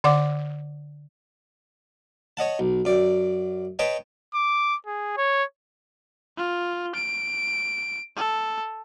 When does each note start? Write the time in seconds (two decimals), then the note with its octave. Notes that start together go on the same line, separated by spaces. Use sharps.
0.04 D3 D5 F#5 D6
2.37 C#5 D#5 F#5 A5
2.59 B1
2.85 F#2 D5
3.79 B4 C#5 D#5 G5 A5
4.34 D6
4.86 G#4
5.17 C#5
6.37 F4
6.95 D7
8.16 A4